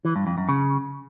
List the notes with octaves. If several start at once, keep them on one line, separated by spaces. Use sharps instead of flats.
E3
G2
F2
F#2
C#3